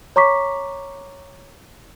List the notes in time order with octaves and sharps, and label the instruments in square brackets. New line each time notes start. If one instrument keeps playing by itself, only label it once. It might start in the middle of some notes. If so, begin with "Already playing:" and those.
[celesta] C#5 A#5 C#6 D6 B6